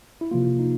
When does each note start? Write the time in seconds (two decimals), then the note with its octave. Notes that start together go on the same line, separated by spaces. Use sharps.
0.21 E4
0.31 C3 F3 A#3 F4
0.59 D#4